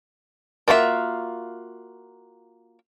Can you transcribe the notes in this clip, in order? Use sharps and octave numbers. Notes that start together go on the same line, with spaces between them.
A#3 F4 F#4 C5 E5